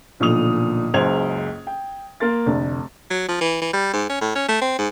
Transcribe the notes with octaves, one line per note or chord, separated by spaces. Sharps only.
B1 A#2 D3 F3 D#6 F7
F#1 C#2 F#2 C5 G#6 F7
G5
A#3 A#4 C6 A6
F1 D2
F#3
F3
E3
E3
G3
G#2
C#4
A2
C#4
A3
C4
G#2